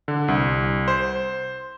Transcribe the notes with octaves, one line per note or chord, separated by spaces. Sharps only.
D3
C2
C5